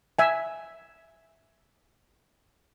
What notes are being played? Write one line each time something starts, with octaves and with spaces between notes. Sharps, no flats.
E5 G#5